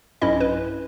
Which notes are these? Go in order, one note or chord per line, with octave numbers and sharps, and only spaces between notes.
B1 G2 C#4 E4 D#5
B4